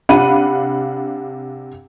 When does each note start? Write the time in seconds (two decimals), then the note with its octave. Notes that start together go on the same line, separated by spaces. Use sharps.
0.09 C3 D4 F5 F#5 B5 D#7